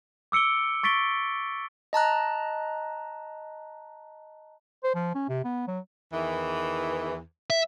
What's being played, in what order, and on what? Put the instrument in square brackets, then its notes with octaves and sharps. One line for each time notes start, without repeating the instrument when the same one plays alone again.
[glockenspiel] D6 E6 C#7 D7 G7
C#6 A6 B6 D7 G7
[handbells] D#5 A5 A#5 F#6
[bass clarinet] C5
F3
C#4
C3
B3
F#3
[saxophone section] E2 D#3 E3
[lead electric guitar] E5